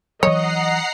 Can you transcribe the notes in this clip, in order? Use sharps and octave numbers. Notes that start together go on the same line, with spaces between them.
E3 F#3 C#5 D#5 F#5 A#5 C7